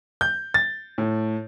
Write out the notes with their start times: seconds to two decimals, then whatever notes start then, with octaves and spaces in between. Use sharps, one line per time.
0.21 G6
0.54 A6
0.98 A2